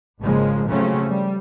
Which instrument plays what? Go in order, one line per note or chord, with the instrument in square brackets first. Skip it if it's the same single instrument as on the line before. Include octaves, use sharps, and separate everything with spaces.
[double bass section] G#1 C#3 F3 G#3 A#3
C#3 F3 F#3 A3 C4 C#4
G3